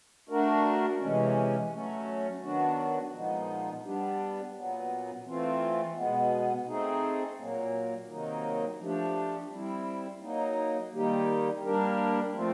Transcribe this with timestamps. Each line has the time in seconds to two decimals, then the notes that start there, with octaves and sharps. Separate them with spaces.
0.29 A3 D4 F#4 A#4
0.99 C3 E3 G#3 C#4
1.71 F#3 A3 C#4
2.41 D#3 F#3 B3 D4 F#4
3.12 A#2 F3 G#3 B3 D#4
3.83 G3 B3 D4 G4
4.54 A#2 F#3 B3
5.25 E3 A3 C4 F4
5.96 B2 G#3 B3
6.67 A3 C4 D#4 G#4
7.38 A#2 F#3 A#3
8.08 C3 D#3 F#3 A#3 D#4
8.79 F3 A3 D4 G4
9.50 G3 C4 E4
10.21 F#3 A#3 D#4
10.93 D#3 G3 A#3 D#4 G4
11.63 G3 A#3 D4 G4 A#4
12.34 F3 A3 C4 F4